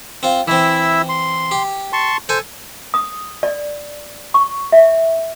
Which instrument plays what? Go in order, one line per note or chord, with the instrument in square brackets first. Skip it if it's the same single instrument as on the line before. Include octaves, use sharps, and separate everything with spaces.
[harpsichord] C4 F4
[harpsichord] E3 C4 [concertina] E4 E5 E6
[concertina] C6
[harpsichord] G4
[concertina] A5 C6 C#6
[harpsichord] A4 G#5 [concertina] C5
[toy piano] D#6
D5
C#6
E5